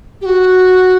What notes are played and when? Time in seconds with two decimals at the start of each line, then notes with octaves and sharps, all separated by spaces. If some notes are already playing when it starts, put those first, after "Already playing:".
0.21 G4
0.26 F#4